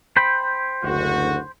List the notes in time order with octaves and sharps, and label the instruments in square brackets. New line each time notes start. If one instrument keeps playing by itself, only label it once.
[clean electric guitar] C5 G5 B5
[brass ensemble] F#1 D2 F#4